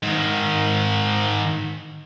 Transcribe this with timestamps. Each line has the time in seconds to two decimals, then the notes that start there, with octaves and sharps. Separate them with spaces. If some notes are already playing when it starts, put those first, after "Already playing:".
0.03 G#2 D#3